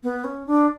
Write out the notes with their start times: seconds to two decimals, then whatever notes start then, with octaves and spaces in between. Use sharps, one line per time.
0.03 B3
0.24 C#4
0.47 D4